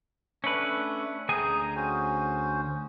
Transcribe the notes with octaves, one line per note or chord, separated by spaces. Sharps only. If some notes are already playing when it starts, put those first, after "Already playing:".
A3 C#4 D4 B4 E5
D2 G#4 G5 G#5 A#5
C#4 F#4 C5